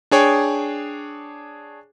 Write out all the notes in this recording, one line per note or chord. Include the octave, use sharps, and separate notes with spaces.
D4 G#4 C#5 G5